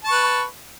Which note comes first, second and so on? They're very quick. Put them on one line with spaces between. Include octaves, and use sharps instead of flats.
A5 C#6 B4